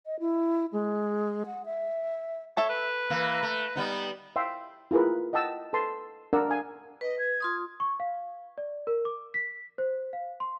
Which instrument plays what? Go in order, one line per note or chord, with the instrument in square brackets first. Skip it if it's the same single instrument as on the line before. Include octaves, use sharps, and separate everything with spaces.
[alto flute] D#5
E4
G#3
F#5
E5
[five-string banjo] A4 E5 A5 [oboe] C#5
[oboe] B4
[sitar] E3 A#3
A3
G3 B3 D#4
[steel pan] E5 F5 G5 C6
E4 F4 G#4 A#4 B4
D#5 F#5 G5 A5 E6
A4 B4 A5 C6
D4 A#4 D5 F#5 A#5 E6
F5 G#5
[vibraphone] B4 [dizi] D#5
[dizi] G#6
[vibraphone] F4 C6 D#6
[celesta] C#6
F5
D5
A#4
D6
B6
C5
F5
C6